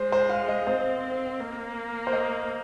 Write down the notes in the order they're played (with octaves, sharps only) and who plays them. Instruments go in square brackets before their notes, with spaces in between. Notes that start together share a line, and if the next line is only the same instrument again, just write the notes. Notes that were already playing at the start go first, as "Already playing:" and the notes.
Already playing: [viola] G#3 [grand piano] C5
[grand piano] C5
F5
D#5
[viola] C4 [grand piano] C5
[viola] A#3
[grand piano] C5
D#5